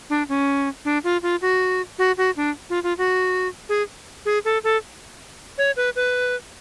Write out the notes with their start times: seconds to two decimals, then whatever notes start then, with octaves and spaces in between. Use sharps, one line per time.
0.10 D4
0.29 C#4
0.85 D4
1.04 F4
1.23 F4
1.42 F#4
1.98 F#4
2.17 F#4
2.37 D4
2.70 F4
2.83 F4
2.98 F#4
3.69 G#4
4.25 G#4
4.45 A4
4.64 A4
5.58 C#5
5.76 B4
5.96 B4